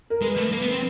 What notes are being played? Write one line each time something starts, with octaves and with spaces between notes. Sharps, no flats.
A#4
G#3 B4
A3
A#3 B4
B3
C4